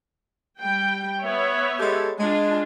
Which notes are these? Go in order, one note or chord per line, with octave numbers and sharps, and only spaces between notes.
G3 G5
B3 C#5 E5
G#3 G4 A4
G#3 D4 F4